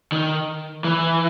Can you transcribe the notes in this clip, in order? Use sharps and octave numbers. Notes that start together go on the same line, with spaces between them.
D#3
E3